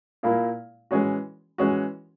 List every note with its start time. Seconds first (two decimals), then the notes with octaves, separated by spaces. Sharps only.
0.23 A#2 A#3 E4
0.91 E3 G#3 C#4 F#4
1.58 E3 G#3 C#4 F#4